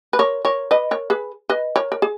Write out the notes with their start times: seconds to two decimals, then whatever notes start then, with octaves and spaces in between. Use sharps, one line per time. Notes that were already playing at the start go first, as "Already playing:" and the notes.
0.13 B4
0.19 A#4 C#5
0.45 A#4 C#5
0.71 B4 D#5
0.91 A#4 C#5
1.10 G#4 B4
1.50 B4 D#5
1.76 A#4 C#5
1.92 A#4
2.02 G#4